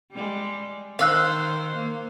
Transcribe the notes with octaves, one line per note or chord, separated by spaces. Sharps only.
G3 G#3
D#3 C5 F5 E6 F#6
A#3